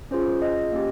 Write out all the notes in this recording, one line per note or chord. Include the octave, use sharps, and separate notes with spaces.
C#4 F4 G#4 C5
D#5
A#3 C#4 G4